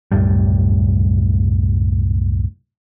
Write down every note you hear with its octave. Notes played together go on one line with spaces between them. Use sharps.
C2 F#2 A2 G3